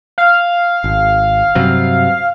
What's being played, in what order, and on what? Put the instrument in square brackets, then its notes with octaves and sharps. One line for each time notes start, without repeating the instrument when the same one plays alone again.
[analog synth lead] F5
[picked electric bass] G#1
G2 C3 F#3